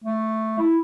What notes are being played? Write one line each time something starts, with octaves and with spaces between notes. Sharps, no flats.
A3
E4